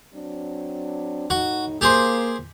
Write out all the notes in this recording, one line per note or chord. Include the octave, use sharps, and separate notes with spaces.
F#3 C4 D4
A2 D#4 F#4
A#3 G4 G#4 C5